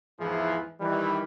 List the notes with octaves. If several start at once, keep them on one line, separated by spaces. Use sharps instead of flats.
E2 G#2 E3 F3 E4 G#4
D#3 E3 G3